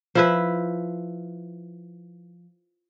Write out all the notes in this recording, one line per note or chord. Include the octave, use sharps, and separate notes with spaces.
F3 E4 B4